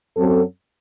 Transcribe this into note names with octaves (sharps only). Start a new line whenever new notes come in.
F#2 F#3 C4 A4